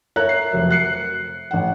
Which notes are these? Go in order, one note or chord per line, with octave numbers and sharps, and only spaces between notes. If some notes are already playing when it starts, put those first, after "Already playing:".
A4 A#4 C#5 E5 A#5 F#6
C7
F1 F#3 A#4 E5
F#6 C7 C#7
A1 F#5